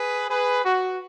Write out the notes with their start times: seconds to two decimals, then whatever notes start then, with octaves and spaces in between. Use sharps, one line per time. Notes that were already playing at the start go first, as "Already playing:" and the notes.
Already playing: G#4 B4
0.29 G#4 B4
0.63 F#4